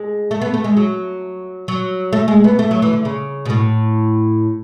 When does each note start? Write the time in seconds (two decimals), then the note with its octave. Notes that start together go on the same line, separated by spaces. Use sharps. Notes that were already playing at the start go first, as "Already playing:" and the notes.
Already playing: G#3
0.31 A3
0.41 B3
0.54 A3
0.64 G#3
0.77 F#3
1.68 F#3
2.13 A3
2.28 G#3
2.44 B3
2.59 A3
2.71 F#3
2.82 E3
2.93 D3
3.05 C#3
3.45 B2
3.50 A2